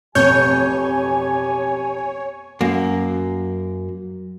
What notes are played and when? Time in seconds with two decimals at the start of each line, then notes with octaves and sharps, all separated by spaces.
0.15 A1 F2 B2 G4 C#5 G#5 G6
2.61 F#2 A#3